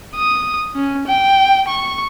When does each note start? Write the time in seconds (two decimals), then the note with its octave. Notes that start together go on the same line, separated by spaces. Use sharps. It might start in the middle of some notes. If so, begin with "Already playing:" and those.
0.16 D#6
0.76 C#4
1.07 G5
1.68 C#6